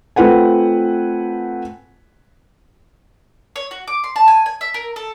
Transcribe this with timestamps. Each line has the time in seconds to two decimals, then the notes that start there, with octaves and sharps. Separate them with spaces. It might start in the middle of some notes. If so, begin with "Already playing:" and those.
0.16 A3 C4 F4 B4 F#5 G#5
3.56 C#5
3.71 F#4
3.88 D6
4.04 C6
4.16 A5
4.28 G#5
4.46 G#5
4.61 E5
4.74 A#4
4.96 A4